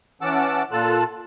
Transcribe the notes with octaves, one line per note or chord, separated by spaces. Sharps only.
E3 C#4 F#5 A5 D6 E6
A#2 F4 A4 A5 F#6